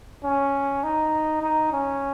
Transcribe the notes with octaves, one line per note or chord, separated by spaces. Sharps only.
C#4
D#4
D#4
C#4